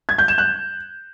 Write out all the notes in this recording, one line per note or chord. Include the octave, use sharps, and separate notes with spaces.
G#6
G6
E7
F#6